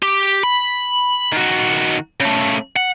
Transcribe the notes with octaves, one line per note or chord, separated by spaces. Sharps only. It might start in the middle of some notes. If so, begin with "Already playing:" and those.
G4
B5
D#3 F#4
C#3 A3
F#5